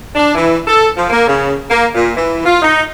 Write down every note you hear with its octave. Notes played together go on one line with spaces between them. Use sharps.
D4
E3
A4
F3
A#3
C#3
A#3
A#2
E3
F4
D#4